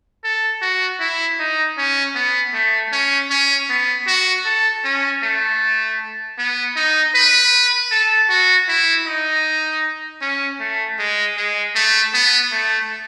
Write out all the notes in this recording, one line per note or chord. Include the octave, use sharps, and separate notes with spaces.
A4
F#4
E4
D#4
C#4
B3
A3
C#4
C#4
B3
F#4
A4
C#4
A3
B3
D#4
B4
A4
F#4
E4
D#4
C#4
A3
G#3
G#3
A3
B3
A3